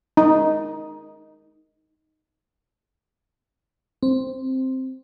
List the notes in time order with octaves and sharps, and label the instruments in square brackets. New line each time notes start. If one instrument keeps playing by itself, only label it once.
[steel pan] D#4
[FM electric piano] C4